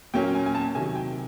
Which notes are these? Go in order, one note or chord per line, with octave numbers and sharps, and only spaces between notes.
A#2 F#3 A#3 C#4 G5
G#5
G#5
A5
C3 D#3 F#3 G#5
G5